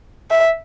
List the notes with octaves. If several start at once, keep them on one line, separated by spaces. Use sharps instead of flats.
E5